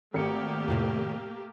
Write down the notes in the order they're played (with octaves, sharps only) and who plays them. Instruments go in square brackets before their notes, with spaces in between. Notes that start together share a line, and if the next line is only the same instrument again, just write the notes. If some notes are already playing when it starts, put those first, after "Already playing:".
[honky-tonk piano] G#1 C#7 [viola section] A3 A#3 G4
[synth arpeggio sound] F2 A2 C3